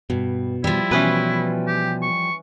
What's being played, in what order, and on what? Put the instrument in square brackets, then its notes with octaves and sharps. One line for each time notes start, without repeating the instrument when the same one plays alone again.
[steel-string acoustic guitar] G2 [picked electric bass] B2
[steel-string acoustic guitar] F3 G3 [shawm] E4
[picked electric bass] B2 [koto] E3 C#4 B4
[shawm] G4
C#6